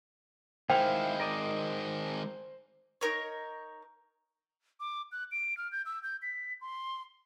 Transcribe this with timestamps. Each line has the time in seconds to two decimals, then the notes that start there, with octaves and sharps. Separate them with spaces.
0.70 D#3 G#3 E4 C5 F5 G5
1.20 A#4 D5 D#5
3.01 D#4 A#4 C#5
4.80 D6
5.12 F#6
5.32 D7
5.57 F6
5.72 G6
5.85 E6
6.03 G6
6.22 B6
6.61 C6